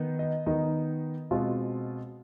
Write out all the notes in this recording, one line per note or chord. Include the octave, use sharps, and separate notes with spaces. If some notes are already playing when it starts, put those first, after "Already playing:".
Already playing: D#3 B3 D#4
D#5
D#3 B3 D#4
B2 G#3 C4 F4